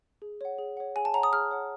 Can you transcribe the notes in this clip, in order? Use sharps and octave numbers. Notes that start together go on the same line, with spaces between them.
G#4
C#5 F#5
G#4
C#5 F#5
G#4 G#5
A5
C#5 F#5 A#5
D#6
G#4 F6
C#5 F#5